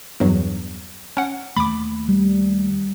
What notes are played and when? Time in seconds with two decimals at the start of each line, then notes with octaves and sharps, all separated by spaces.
0.20 E2 G2 F#3
1.17 C#4 F#5
1.56 D#2 A3 B5 D6
2.08 G3